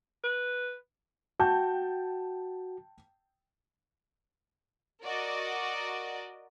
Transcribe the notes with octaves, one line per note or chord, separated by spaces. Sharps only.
B4
F#4 G5 A5 G6
F#4 A#4 D5 D#5